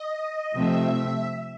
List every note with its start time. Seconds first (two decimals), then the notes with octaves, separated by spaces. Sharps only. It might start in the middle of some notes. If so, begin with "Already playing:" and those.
Already playing: D#5
0.55 C3 F3 A3 C4 E5